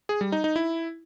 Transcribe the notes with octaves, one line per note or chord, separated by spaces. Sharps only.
G#4
G3
D#4
D#4
E4